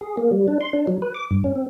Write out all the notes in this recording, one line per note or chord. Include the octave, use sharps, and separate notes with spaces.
G#4
A#3
G3
D4
C6
D4
F#3
B4
D6
G2
C#4
C4